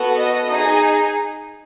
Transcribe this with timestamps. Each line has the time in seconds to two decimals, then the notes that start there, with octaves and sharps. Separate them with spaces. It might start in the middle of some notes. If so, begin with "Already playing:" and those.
Already playing: B3 F#4 A4
0.18 D#5
0.51 D#4 G#4 D#5